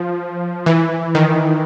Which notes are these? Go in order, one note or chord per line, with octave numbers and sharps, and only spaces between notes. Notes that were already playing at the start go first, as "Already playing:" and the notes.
Already playing: F3
E3
D#3